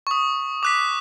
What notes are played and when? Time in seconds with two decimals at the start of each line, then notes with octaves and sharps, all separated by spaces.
0.07 C#6 D#6
0.63 D6 F#6 B6